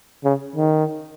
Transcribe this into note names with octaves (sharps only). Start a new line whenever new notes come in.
C#3
D#3